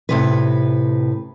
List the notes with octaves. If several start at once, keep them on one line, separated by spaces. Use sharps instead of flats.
A2 C3 B4